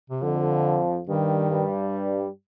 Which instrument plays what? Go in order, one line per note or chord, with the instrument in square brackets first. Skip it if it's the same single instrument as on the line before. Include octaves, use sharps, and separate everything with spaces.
[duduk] C3
[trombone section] F2 F3 [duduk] D3
[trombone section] G2 G3 [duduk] D#3
[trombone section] G2 G3